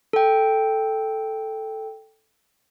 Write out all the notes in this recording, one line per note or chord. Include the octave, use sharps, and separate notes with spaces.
A4 G5